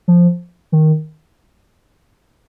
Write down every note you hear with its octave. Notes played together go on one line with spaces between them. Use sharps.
F3
D#3